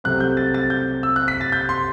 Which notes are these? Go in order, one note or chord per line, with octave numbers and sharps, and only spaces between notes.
C2 C3 F#3 A3 C4 F#6
G6
A6
A6
G6
E6
F#6
B6
A6
G6
C6